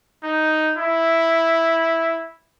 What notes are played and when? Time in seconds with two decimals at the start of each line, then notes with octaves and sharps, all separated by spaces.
0.24 D#4
0.78 E4